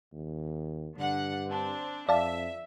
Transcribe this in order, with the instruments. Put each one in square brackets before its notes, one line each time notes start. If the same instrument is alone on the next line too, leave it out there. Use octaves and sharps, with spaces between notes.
[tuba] D#2
[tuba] G2 [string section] D3 F#5
[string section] C4 D4
[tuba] F2 [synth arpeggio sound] D5 F5 A5 [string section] E5